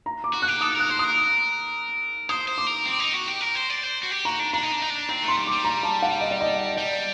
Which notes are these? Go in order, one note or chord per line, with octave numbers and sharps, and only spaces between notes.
A#5
D6
F#4
F#6
G4
A4 D#6
A#4 F#6
C5
A#4 D#6
C5 D#6
C5
D6
A#4
C4
D#4
F#4
G4
A#4
C5
D5
C5
F#4
G4
F#4 A#5
D4
D4 A#5
D#4
D4
D#4
D4
C4 A#5
A3 C6
G3
D6
G3
A#5
A5
F#5
D#5
D5
D#5
G3 D5